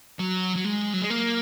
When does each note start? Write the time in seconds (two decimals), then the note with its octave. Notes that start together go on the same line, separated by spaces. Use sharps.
0.19 F#3
0.56 F#3
0.65 G#3
0.94 F#3
1.02 G#3
1.10 A#3